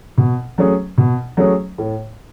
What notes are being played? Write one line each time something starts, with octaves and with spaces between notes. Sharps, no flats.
B2
F#3 A3 C#4 G#4
B2
F#3 A3 C#4 G#4
A2